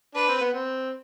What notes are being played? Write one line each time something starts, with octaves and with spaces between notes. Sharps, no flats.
D4 B4
C4
B3
C4